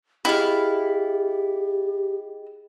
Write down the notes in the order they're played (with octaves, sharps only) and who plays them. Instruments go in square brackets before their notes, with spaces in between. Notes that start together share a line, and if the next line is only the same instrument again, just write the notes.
[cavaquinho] E4 F5 [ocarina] G4 [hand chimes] G#4 D#5 G5